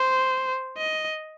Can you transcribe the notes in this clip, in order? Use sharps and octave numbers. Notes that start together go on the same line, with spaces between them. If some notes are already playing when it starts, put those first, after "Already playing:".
Already playing: C5
D#5